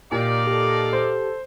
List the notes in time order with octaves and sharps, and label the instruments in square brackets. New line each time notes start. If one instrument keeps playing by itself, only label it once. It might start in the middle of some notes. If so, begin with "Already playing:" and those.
[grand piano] A#2 [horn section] D#4 D5 F5 [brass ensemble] G4
[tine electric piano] G4 [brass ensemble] A4
[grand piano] C5